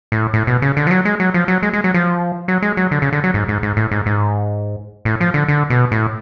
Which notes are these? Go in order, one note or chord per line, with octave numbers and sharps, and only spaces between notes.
A2
A2
B2
C#3
D3
F3
F#3
G#3
F#3
F3
F#3
G#3
G#3
F#3
F3
F#3
G#3
F#3
D3
C#3
D3
F#3
G#2
G#2
G#2
A2
G#2
G#2
A2
F3
D3
D3
B2
A2